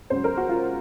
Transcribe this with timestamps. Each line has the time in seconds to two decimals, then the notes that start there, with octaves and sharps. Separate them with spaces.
0.10 C#2 C#3 F#3 C5
0.24 A#4
0.37 F#4
0.49 F4